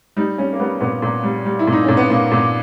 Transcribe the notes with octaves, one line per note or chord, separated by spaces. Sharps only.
G3 D#4
G3 C#4
A#3
G3 B3
A#2 B3
A#2
G3
G3
E4
A#2
D#4
A#2 C#4
B3
A#2 A#3
A#2